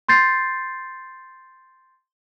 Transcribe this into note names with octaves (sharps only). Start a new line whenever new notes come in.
C6 G6 A6 C7